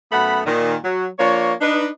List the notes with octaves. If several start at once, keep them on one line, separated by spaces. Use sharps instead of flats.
F#2 A3 B3 F#5 B5
A#2 D#3
F#3
F3 A#3 D4 C#5
D4 D#4 B4